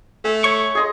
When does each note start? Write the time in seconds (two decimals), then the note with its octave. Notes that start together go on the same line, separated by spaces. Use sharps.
0.25 A3 G#5
0.44 C#5 C#6
0.75 G#4 D#5 C6